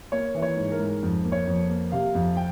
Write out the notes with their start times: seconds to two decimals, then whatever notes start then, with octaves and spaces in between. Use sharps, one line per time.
0.12 A#3 C#5
0.35 E3
0.42 C#5
0.57 G#2
0.72 A#4
0.79 G#2
1.03 F2
1.25 A#3
1.32 C#5
1.47 F2
1.69 A#3
1.92 C3 F5
2.15 F2
2.37 G5